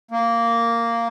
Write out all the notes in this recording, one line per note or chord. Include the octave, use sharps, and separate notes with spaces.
A#3